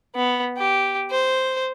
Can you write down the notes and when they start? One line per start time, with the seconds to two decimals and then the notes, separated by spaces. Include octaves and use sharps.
0.15 B3
0.58 G4
1.11 C5